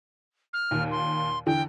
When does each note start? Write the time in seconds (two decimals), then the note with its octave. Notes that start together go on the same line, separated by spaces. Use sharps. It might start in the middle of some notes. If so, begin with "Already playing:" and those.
0.53 F6
0.71 D#2 A#2
0.91 C6
1.46 E2 D3 E3 G5